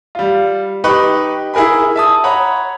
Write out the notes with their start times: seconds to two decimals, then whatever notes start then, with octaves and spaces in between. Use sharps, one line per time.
0.15 G3 F4
0.84 D#4 G4 B4 B5 C#6
1.54 E4 G#4 A#4 G#5 B5
1.96 E5 A5 D#6
2.24 C#5 F#5 A#5 B5